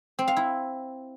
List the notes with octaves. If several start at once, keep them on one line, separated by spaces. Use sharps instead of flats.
C4
F5
E4